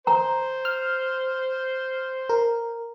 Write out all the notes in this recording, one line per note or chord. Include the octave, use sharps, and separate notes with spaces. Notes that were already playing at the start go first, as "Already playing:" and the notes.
C5 A#5
F6
A#4